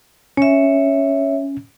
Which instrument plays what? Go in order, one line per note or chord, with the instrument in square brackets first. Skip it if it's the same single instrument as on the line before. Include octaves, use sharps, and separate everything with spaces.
[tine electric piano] C#4 [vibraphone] C#5 E5